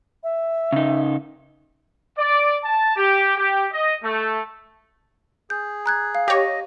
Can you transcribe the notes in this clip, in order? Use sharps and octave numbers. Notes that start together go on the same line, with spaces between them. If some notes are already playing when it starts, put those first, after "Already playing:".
E5
C#3 D#4
D5
A5
G4
G4
D#5
A3
G#4 G6
A#5 F#6 G#6
F5
G4 C#5 D#5